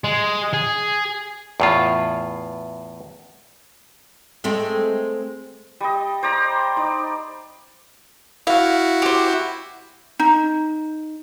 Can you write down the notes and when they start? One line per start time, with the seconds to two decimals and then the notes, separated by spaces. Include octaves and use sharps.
0.04 G#3
0.54 G#4
1.60 E2 A2 F4
4.44 G#3 A3 C4
5.81 G3 D#5
6.23 C5 D5 A#5
6.76 D#4 D5
8.47 E4 F#4 F5
9.02 G4 C5
10.19 D#4